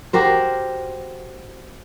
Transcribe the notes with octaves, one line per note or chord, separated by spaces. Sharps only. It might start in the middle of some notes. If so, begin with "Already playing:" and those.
F#4 G4 A#4 C5